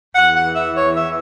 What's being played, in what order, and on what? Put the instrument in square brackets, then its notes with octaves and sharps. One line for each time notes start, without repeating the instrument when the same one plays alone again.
[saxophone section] E2 F#5
F#5
E3
E5
E2 C#5
E5
E3